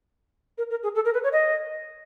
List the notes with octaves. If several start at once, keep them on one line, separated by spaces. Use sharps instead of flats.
A#4
A#4
G#4
A4
A#4
B4
C#5
D#5